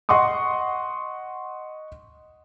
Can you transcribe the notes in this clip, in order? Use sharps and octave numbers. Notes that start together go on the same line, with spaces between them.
D#5 F#5 C6 C#6 D#6